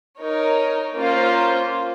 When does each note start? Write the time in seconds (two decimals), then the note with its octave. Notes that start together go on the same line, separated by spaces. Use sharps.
0.17 D#4 A#4 C#5
0.95 A#3 C#4 F4 C5